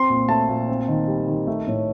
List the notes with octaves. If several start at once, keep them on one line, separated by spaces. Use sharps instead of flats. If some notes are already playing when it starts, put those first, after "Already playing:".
Already playing: C4 C6
A#2
A3 A5
A#2
C4
D#3
G3
D#3
A3
A2